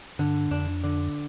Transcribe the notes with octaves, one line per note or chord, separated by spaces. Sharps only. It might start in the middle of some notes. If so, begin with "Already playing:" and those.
G2 D3
F2 D4
D3